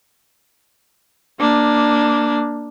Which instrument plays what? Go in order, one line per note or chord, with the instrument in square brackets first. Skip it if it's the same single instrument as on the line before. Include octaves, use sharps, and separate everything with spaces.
[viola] A#3 D4